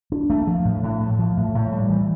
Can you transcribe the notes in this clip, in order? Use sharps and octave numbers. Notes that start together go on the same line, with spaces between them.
D4
A3
F3
A2
A2
A3
F3
A2
A2
G3
E3